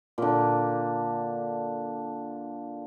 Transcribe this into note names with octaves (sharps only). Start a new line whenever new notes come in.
A#2 D3